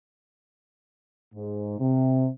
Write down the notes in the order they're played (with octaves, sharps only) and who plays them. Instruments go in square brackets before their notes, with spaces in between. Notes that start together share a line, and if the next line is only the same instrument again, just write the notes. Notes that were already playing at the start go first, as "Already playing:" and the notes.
[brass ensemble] G#2
C3